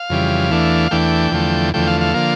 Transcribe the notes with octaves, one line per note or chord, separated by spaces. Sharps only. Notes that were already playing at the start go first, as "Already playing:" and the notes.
Already playing: F5
F2 C#3 E3 G3
E2 E3 A3 D4
E2 E3 A3 D4 G5
E2 D3 F3 A3
E2 D3 F3 A3 G5
F5
F5
D3 F3 A#3